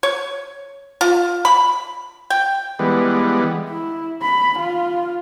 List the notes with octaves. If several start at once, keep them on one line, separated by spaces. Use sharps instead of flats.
C#5
F4
B5
G5
E3 G3 G#3 B3
E4
B5
F4